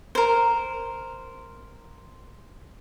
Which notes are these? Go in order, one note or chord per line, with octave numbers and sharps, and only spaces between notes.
A#4 C5